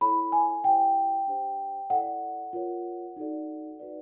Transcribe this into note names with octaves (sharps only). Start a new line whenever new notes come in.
E4 A4 C#5 B5
G#5
E4 G4 C5 G5
D4 G4 C5
E4 A4 D5 F#5
F4 A#4 C#5
D#4 F#4 A4 D5
D#4 F#4 B4 D5